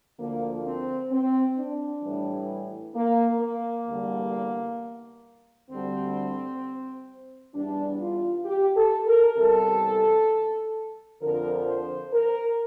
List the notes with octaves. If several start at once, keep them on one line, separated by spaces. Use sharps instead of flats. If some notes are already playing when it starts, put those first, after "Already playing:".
D2 D3 F3 A#3
C4
C4
D4
A2 E3 G3
A#3
A#3
E2 D3 G3
D2 D3 G3 C4
E2 E3 G3 D4
F4
G4
A4
A#4
E2 C3 E3 G3 A4
F2 D3 F3 A#4
C5
A#4